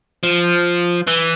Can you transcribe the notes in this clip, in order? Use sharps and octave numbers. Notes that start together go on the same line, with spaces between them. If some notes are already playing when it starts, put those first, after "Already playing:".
F3
E3